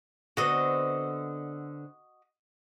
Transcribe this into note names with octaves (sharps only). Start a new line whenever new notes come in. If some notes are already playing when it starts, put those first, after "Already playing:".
D3 B3 C4 F#4 D#5